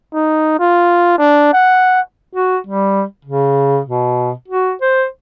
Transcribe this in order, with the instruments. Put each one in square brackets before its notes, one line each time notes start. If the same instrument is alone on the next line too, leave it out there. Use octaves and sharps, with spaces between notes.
[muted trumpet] D#4
F4
D4
F#5
[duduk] F#4
G3
C#3
B2
F#4
C5